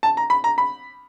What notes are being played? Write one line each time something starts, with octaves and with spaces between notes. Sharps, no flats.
A5
A#5
B5
A#5
B5